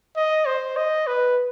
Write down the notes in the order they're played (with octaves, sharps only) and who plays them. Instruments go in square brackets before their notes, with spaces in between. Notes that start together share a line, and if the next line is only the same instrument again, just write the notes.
[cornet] D#5
C5
D#5
B4